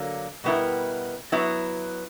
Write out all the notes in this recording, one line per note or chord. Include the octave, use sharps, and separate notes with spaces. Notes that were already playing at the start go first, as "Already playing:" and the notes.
Already playing: D3 F#3 A#3
B2 G3 B3 E4 A#4
F#3 B3 E4